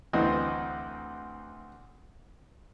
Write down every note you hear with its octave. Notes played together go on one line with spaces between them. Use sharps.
D2 E3 C4 D#5